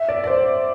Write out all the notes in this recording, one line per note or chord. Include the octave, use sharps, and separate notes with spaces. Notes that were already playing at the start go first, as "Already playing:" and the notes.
Already playing: E5
D5
D5
C5